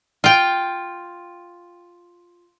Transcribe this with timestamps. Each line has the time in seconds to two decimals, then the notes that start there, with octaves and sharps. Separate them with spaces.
0.24 F4 G5